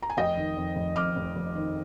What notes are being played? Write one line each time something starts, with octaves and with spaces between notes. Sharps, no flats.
A#5
G#5
F1 D#5 G5
D#3
F2
F1
F2 D6 F6
F1
F1
D#3